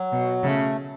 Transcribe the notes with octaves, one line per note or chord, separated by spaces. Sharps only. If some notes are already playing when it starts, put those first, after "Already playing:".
Already playing: F#3
B2
C#3 A3